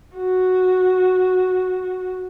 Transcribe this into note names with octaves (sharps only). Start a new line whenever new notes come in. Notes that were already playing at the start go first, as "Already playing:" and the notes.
F#4